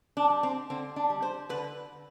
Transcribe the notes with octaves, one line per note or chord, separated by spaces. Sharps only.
D4
G3
C4
D3 C4
D4
G3
C5
D3 B4